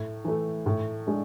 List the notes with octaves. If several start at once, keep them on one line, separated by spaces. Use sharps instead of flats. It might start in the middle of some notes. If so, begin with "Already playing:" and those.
Already playing: A2
E3 A3
A2
G#3 D4